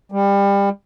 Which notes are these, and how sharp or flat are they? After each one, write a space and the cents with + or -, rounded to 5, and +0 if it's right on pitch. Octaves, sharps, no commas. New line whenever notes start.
G3 +25